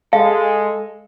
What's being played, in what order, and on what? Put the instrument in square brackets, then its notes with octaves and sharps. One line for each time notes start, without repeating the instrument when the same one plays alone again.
[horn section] G#3 [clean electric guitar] A4 [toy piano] F5